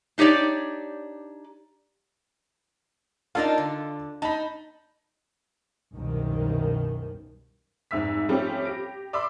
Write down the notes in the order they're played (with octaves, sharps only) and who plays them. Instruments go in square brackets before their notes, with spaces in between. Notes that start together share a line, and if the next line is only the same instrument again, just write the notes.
[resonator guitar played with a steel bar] D4 D#4 G4 C#5 D5
[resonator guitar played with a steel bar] A#3 D4 D#4 [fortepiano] F4 A4
[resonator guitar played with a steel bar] D3
[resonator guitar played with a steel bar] D#4 [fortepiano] A5 B5
[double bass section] C2 F#2 B2 D#3
[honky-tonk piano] F1 G#2 E5 E6 B6
F3 G3 A3 C4 C#4 G4
G4 A#6 D7
D5 E5 B5 C6 D6 E6